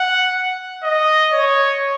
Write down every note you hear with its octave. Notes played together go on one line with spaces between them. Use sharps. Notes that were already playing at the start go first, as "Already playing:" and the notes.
Already playing: F#5
D#5
C#5